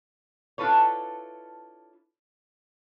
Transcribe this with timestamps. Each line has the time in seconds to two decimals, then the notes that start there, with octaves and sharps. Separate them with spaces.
0.58 D4 E4 F4 A4 B4 C#5